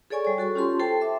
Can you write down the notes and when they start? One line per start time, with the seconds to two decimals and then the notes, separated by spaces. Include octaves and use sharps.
0.10 G#4 A4 C#5 D5 G#5 C#6
0.25 G3 C#5
0.38 F#4 A4 C#6
0.55 C#4 F4 G4 A5 C6
0.80 A4 C5 G5 A5
1.01 E5 C6 D6